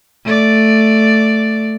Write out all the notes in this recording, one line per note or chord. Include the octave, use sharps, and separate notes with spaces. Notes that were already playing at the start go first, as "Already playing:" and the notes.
A3 D5